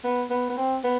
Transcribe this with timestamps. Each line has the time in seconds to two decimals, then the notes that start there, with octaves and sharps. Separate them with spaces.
0.04 B3
0.30 B3
0.50 B3
0.57 C4
0.84 B3